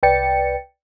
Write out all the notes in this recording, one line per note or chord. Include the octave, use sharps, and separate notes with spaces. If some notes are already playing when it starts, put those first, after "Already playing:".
C2 B4 D5 G5 A6 C#7